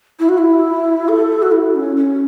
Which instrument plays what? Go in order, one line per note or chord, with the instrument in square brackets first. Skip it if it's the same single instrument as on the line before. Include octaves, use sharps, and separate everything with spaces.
[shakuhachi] E4
F#4
E4
A4
F#4
E4
C#4
C#4